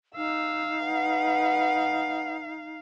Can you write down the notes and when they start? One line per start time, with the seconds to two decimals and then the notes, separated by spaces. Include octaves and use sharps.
0.17 D#4 F5 E6
0.85 B4 F#5